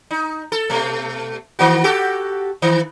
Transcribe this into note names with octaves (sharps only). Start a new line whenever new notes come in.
D#4
A4
B2 A3
D#3 A#3 F#4
F#4 G4 A4
D#3